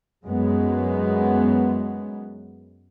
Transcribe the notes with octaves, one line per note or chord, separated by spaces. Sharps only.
F#2 G#3 B3